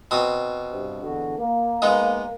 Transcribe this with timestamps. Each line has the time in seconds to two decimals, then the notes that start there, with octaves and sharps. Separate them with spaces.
0.11 B2 C4 D#6
0.71 G2 C3
1.03 E2 D3 F#4
1.39 A#3
1.82 G#3 B3 D#4